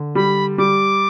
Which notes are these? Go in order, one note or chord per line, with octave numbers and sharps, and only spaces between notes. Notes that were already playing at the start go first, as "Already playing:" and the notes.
Already playing: D3
G3 B5
G3 D6